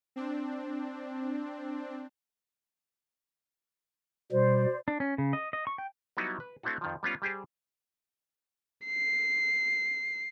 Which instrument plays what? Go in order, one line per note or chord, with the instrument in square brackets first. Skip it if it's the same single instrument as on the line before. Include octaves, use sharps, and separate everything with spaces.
[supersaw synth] C4 D4
[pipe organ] B2 G3 [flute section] C5 D5
[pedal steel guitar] D4
C#4
C#3
D#5
D#5
C#6
G5
[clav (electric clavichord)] F#3 G3 B3 D#4 E4 F#4
B4
A3 C4 D4 E4 F#4
F2 D#3 F3
G3 B3 C#4 F4
G3 G4 G#4 C5
[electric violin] C7